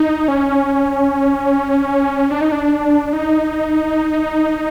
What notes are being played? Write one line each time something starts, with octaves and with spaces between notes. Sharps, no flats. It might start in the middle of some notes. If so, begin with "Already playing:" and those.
Already playing: D#4
C#4
D4
D#4
D4
D#4